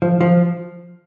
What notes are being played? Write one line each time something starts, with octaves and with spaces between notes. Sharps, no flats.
F3
F3